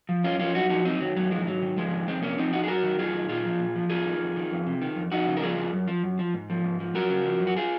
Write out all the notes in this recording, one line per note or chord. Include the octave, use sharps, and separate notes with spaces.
F3
F#2 C#4 F4
F3 C#4 F4
F#2 D#4 F#4
F3 D#4 F#4
F#2 C4 D#4
D#3 F#3
F#2 F#3
D#3 F3 G#3
G#2 F#3
D#3
G#2 F3 G#3
D#3
F2 G#3 C4
C3 A#3 C#4
F3 C4 D#4
F2 D#4 F#4
G#4
F#2 F#4 A#4
D#3
F#2 F4 G#4
D#3
A#2 F4 G#4
F3
A#2
F3
F2 F4 G#4
D#3
F2
D#3
F2
C3
D#3
F2
F2 D#4 F#4
C#3
A#4
F3 F4 G#4
F2
F#2
F3
F#2
F3
G#2
F3
G#2
F3
F#2 F#4 A#4
C#3
F3
F#2
F#4
F4 G#4